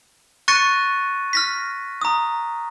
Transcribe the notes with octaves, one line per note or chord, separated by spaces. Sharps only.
C#6 F#6 A6 A#6 C#7 D#7
F6 A#6 B6
A#5 D#6